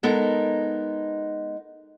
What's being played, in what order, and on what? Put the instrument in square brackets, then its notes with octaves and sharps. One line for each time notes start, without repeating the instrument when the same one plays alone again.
[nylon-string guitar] G#3 B3 D#4 A4 A#4